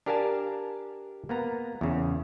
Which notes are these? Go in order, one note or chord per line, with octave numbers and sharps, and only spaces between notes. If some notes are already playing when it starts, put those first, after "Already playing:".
D4 G4 A#4 F5 G#5 A5
A#3 B3 A#5
E2 C#3